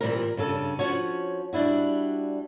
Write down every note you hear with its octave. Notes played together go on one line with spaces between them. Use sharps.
A#2 C#3 E3 G3 C4 A#4
G2 C#3 A4
F3 C#4 F#4 C#5
G3 D4 E4 F#4